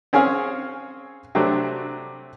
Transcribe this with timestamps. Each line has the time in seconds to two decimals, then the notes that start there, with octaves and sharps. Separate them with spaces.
0.13 C4 C#4 G#4 C#5 F5
1.35 C3 F#3 A3 C4 D4